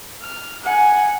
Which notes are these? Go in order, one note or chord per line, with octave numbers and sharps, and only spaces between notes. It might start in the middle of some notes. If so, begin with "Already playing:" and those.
F6
F#5 G#5